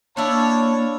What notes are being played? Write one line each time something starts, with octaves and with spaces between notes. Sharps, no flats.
A#3 D4 E4 C#5 F5 A5